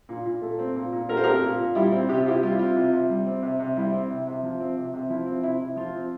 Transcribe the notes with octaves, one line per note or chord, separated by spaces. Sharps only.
A#2
A#2
A3
C4
A#2
A#2
A3 A#4
C5
C4 G4 A#4
A#2
A#2
G3 E4 G4
C4
C3 G4
F4
C3 E4 G4
G3 F4
E4
C4 F4
C3
C3
G3
C4
C3
C3
G3 E4
C4
C3
C3
F3
C4
C3
C3
F3 E4
C4
C3 E4
C3
F3 F4
C4